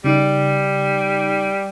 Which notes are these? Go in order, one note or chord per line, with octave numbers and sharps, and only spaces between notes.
C#3 G3 D#4